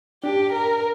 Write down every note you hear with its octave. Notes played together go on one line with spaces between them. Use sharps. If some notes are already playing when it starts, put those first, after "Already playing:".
D4 G4
A#4